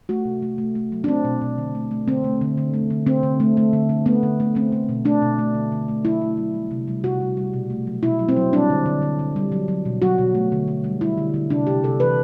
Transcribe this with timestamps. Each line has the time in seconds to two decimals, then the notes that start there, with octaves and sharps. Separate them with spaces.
0.09 A3 F#4
0.25 C3
0.42 A3
0.58 A3
0.75 A3
0.92 F#3
1.04 D4
1.08 A3 C4
1.25 B2
1.42 B2
1.58 D3
1.75 A3
1.91 A3
2.08 D3 C4
2.24 A3
2.41 D3
2.58 D3
2.74 A3
2.90 D3
3.06 D3 C4
3.23 D3
3.40 A3
3.57 A3
3.73 D3
3.89 D3
4.06 A3 B3
4.23 D3
4.40 A3
4.55 A3 C4
4.72 A3
4.89 B2
5.05 A3 D4
5.22 B2
5.39 A3
5.54 D3
5.72 D3
5.88 A3
6.05 F#3 E4
6.22 A3
6.37 F#3
6.54 G3
6.71 C3
6.88 G3
7.04 C3 F#4
7.21 G3
7.37 G3
7.53 B2
7.70 A3
7.87 F#3
8.03 B2 E4
8.19 F#3
8.29 C4
8.37 F#3
8.53 G3 D4
8.70 D3
8.86 D3
9.02 D3
9.19 D3
9.36 G3
9.52 F#3
9.68 F#3
9.85 B2
10.02 F#3 F#4
10.18 B2
10.35 A3
10.52 D3
10.68 D3
10.84 G3
11.01 G3 E4
11.18 D3
11.34 D3
11.50 C3 D4
11.67 C3 G4
11.83 C3 A4
12.00 E3 B4